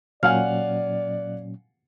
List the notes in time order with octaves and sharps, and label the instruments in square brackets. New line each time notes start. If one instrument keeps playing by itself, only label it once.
[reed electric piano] A#2 F#3 C#4 [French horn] D5 [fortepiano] F5 F#5 G#5 [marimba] F6